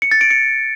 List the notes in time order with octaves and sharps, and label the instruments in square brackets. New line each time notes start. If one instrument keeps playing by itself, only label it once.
[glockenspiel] C#7
A6
D7
C#7